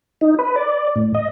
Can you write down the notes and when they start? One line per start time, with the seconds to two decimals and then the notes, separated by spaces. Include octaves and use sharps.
0.21 D#4
0.39 B4
0.56 D5
0.96 A2
1.14 D#5